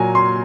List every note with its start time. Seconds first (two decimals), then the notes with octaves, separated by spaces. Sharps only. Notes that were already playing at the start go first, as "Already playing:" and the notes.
Already playing: A#2 F#3 A#3 G#5
0.15 C6